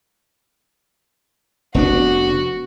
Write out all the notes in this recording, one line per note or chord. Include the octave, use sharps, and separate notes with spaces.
F1 B3 D4 F#4